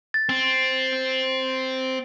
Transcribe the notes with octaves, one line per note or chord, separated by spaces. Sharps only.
A6
C4